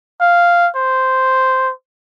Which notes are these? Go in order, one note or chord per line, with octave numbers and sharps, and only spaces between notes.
F5
C5